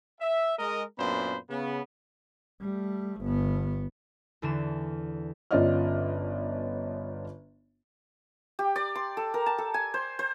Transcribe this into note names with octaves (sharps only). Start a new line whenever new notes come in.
E5
G#3 A#4 D#5
F#2 A#2 B3 D4 C5 B5
C#3 B3
G3 A3
G1 B3
E2 D3 E3 E7
G1 C#4 F4 D5 D#5 F6
G4
D5
C6
A4
A#4
A5
A4
G#5
C5
C5